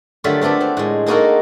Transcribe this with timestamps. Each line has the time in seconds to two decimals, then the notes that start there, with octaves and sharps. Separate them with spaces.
0.24 D3 F#3 G3 A3 F4 A4
0.42 A3 B3 C4 D4 A4
0.61 C4
0.77 A2 G#3
1.06 G#3 A#3 D#4 F#4 A4 A#4